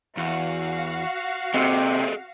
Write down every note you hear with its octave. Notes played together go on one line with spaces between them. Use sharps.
E2 F#4 F5
C3 G#4 A4 D#5